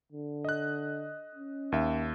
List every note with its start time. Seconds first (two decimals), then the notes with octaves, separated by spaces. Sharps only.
0.12 D3
0.45 D#5 F#6
1.35 C#4
1.72 D#2 E5